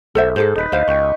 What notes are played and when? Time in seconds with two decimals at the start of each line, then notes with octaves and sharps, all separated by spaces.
0.15 B1 A4 C5 E5
0.36 G#2 G#4 A4 C5
0.56 D#1 D#4 B4
0.72 D2 C5 F5
0.88 C#2 G5 C#6